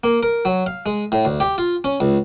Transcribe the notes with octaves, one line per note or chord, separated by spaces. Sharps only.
A#3
A#4
F#3
F5
G#3
A2
D2
G4
F4
C#4
C#2